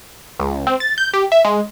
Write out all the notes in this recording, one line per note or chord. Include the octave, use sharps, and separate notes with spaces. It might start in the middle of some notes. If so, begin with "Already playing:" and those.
C#2
C4
A6
G6
G4
E5
G#3